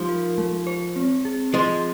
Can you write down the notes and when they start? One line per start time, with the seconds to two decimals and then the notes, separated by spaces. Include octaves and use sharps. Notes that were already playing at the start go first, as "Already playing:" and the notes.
Already playing: F3 G#3 D#4 G4
0.09 A#4
0.38 G#3
0.67 C5
0.96 C4
1.25 G#4
1.54 F3 G#3 F4